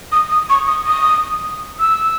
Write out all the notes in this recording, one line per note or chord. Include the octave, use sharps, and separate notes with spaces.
D#6
D#6
C#6
D#6
D#6
E6